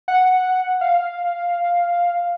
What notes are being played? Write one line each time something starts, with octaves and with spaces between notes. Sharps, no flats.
F#5
F5